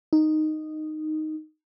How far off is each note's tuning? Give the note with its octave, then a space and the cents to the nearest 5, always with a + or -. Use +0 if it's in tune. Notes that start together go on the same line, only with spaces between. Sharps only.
D#4 -5